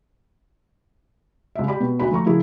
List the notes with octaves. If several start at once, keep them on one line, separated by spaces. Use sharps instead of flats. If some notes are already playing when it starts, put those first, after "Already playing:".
C#2 E5
G4 D5 G5 B5
B2
D2 D#4 F#4 B5
F3 A3 A#5 C#6
C#3 F3 E4 G#4 A#4